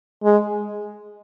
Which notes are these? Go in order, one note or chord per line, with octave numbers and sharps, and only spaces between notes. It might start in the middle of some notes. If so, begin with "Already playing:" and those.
G#3